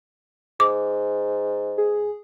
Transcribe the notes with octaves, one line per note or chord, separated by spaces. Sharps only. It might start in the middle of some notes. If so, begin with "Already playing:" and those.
G#2 D6
G#4